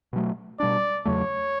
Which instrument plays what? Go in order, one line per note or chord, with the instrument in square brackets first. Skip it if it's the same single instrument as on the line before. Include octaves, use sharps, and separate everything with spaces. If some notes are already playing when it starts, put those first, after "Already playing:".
[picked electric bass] B2 F#3 A3
[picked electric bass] B2 G3 D4 [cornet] D5
[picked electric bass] E2 C#3 F#3 A3 [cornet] C#5